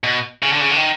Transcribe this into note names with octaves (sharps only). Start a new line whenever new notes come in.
B2
C#3
D3
C#3
D3
D#3